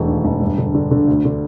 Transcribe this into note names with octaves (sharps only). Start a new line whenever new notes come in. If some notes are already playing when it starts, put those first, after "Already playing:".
Already playing: E1 G#3 A3
D#2
E1
G2
D3
D3
D3
D2
D3